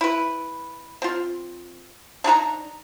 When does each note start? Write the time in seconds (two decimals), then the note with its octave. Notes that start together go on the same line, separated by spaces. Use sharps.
0.01 E4 B4
1.02 C4 F4
2.24 D4 D#4 G#4 A#5